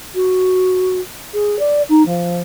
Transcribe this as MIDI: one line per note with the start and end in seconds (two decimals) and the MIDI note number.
0.15 1.00 66
1.34 1.58 68
1.59 1.82 74
1.89 2.05 63
2.06 2.42 53